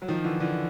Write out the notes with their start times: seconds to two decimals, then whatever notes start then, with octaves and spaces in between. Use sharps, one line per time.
0.02 F#3
0.08 D#3 F3
0.24 D3 E3
0.40 D3 E3